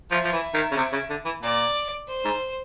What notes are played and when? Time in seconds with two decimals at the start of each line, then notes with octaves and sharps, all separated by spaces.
0.11 F3 E5
0.24 F3
0.33 E3
0.54 D#3
0.72 C#3
0.77 C3
0.92 C#3
1.10 D3
1.25 E3
1.42 A#2 D5
2.08 C5
2.25 G#2